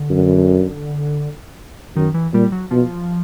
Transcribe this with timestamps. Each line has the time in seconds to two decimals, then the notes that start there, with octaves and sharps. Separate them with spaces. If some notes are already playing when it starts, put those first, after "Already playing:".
Already playing: D3
0.10 F#2
1.96 F#2 D#3
2.14 E3
2.34 A#2 G3
2.52 F#3
2.71 B2 F3